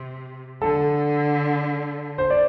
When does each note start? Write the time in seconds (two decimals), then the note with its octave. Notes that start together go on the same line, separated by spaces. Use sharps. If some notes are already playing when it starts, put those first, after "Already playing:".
Already playing: C3
0.62 D3 A4
2.18 C5
2.30 D5